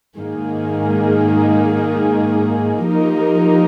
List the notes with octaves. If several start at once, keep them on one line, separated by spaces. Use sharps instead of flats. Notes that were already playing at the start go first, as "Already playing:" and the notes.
G#2 D#3 A#3 D#4 G#4
F3 A#3 D#4 G4 A#4